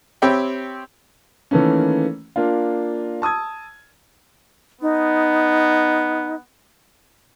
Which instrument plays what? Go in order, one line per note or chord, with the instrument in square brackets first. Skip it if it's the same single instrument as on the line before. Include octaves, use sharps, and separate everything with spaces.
[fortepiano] C4 G4 C#5 E5 G5 B5
[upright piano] D#3 E3 A3 A#3 C#4
A#3 D4 F4
A5 D#6 E6 G#6
[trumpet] B3 [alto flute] D#4